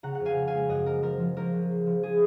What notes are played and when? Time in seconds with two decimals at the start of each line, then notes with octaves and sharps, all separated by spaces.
0.03 C#3 F#5 A#5
0.15 F#5
0.20 F2
0.25 F5 G#5
0.36 C#3
0.47 F5 G#5
0.53 G#3
0.68 F#2 D#5 F#5
0.86 F#2 A#4
1.02 F3 A#4
1.19 F3
1.36 C#2 A#4
1.52 C#2
1.70 A#3
1.86 F3
2.03 G#4